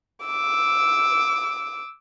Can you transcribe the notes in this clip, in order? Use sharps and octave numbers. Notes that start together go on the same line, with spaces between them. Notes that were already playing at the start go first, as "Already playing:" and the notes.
D6 E6